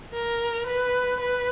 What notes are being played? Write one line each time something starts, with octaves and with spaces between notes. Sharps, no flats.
A#4
B4
B4